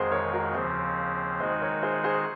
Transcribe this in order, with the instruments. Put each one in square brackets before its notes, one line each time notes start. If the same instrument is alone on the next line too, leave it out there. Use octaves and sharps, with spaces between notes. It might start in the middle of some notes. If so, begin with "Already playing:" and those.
Already playing: [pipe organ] F2 D#3 G#3 [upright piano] C4 F#4 G#4 A#4 C5
[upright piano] A#4 C#5
F#4 A#4
[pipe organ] D#2 C#3 F3 C4 [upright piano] G#4 C5
[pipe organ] D#3 G#3 D#4 F#4 [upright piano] C5 D#5
[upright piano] A#4 C#5
G#4 C5
G#4 C5